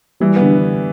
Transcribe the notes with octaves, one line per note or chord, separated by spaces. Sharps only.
E3 G3
B3
D3